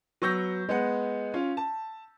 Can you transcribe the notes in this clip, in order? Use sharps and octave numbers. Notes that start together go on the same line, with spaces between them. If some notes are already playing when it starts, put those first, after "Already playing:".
F#3 B3 C#6 E6 G6 A#6
G#3 B3 F#5
C#4 F4
A5